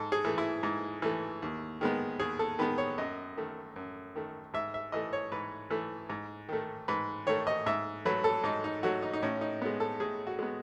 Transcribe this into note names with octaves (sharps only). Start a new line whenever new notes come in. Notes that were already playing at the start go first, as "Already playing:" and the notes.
Already playing: G#2 A4
G#4
E3 A3
E4
G#2
E3 A3
D#2
D#3 G#3 B3
D#2 G#4
A4
D#3 G#3 B3 B4
C#5
F#2 D#5
D#3 A3
F#2
D#3 A3
G#2 E5
E5
E3 A3 D#5
C#5
G#2 B4
E3 A3
G#2
D#3 A3
G#2 B4
D#3 A3 C#5
D#5
G#2 E5
F#3 A3 B4
A4
G#2 D#4
D#4
F#3 A3 F#4
D#4
D#4
A2 C#4
D#4
G#3 B3
A4
A2 G#4
F#4
G#3 B3